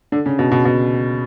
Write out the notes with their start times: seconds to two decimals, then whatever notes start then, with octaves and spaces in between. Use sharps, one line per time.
0.12 D3
0.26 C#3
0.39 B2
0.51 B2
0.65 B2